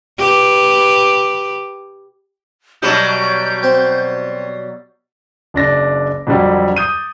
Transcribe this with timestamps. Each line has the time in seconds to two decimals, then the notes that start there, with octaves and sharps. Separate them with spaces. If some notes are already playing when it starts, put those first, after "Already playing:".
0.18 G4 B4
2.82 B2 F#3 G3 G6
3.63 C4
5.54 F#1 D4 A#6
6.27 F2 D3 F#3 G3
6.77 D#6 G6 D#7